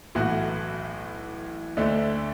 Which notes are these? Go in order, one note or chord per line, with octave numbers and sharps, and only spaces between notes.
B1 A2 E3 A3 F#4
D2 D3 A3 D4